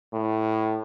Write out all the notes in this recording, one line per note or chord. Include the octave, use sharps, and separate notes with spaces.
A2